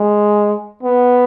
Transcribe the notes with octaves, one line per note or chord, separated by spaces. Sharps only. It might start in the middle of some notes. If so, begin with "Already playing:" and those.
Already playing: G#3
B3